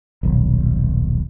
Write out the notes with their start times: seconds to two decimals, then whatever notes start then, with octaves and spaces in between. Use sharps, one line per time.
0.23 D#1 B1